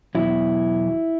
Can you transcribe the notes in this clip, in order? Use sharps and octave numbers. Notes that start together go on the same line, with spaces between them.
E2 B2 F#3 E4